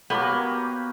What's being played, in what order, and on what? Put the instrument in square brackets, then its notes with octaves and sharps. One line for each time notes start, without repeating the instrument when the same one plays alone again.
[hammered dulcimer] A#3 F#4 A#5 [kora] B3 [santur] G4 C#5 B5